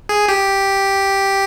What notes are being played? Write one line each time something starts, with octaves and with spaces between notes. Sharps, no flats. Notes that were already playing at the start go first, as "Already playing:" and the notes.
G#4
G4